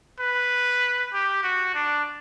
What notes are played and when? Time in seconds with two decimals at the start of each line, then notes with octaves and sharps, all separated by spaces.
0.20 B4
1.13 G4
1.43 F#4
1.74 D4